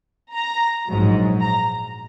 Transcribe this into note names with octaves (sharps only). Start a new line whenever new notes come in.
A#5
A#1 G#2 F#3
A#5